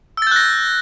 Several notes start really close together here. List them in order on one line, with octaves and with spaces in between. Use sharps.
E6 A6 G6 F#6 A#6